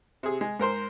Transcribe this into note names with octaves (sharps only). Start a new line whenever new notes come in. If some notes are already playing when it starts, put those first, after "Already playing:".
C3 G#4
G#3
G#2 A#4 C5 C6